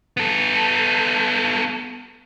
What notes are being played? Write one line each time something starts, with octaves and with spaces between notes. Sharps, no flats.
B3 A4